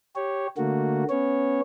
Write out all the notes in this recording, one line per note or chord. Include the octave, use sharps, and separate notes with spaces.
G4 C#5
D3 A3 A#3 F#4
B3 C#4 C#5